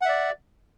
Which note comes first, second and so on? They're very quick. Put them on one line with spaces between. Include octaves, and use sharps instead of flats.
F#5 E5 D5